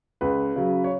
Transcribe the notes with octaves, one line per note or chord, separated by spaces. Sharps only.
C#2 B4
C#3 F#3
C#5